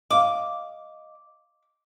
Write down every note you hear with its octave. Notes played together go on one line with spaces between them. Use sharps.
D#5 F5 D6